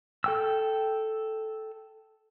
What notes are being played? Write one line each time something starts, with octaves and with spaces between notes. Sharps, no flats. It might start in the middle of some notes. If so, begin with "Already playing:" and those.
A4 G5 E6